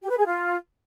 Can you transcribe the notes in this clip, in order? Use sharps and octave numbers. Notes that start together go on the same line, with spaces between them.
G4
B4
G#4
F4